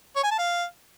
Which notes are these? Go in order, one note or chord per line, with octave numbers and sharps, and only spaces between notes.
C#5
G#5
A5
F5